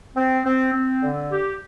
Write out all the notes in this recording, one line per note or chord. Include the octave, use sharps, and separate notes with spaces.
C4
C4
C4
D3
G4